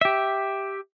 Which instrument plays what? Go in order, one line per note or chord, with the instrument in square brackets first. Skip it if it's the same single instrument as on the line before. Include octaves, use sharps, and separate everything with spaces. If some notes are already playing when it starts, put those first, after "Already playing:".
[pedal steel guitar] G4 E5